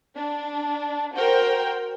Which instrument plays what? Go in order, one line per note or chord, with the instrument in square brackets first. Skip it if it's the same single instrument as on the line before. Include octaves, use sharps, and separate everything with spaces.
[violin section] D4
F#4 A#4 C5 G5